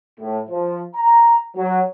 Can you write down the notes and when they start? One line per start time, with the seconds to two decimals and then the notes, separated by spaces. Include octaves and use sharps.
0.20 A2
0.49 F3
0.95 A#5
1.57 F#3